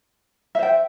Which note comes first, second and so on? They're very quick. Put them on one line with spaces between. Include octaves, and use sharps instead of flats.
E5 C5 G5